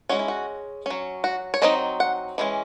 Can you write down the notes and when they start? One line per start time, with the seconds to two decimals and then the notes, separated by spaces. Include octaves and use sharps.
0.09 G#3 C#4 F#4
0.19 E4
0.28 F#4
0.86 F#3 C#4
1.24 F#4
1.54 C#5
1.62 F#3 C4 D#4 D#5
2.00 F#5
2.38 E3 G#3 C#4